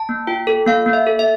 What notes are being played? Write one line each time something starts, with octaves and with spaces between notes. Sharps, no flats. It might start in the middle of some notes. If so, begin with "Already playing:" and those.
Already playing: A5
A#3
F4 G5
A4
A#3 F5
A#3
E5
A4
E5